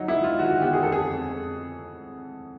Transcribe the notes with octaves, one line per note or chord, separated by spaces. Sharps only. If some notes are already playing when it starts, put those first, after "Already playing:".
Already playing: F#3 D#4
E4
F#3
F4
D#3 F#4
F#4
B3 G4
G#4
F2 A4
G#4
F2
F2